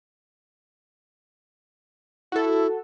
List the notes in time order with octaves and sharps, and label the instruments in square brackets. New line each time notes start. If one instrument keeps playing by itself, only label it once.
[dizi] E4 [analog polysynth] F#4 A4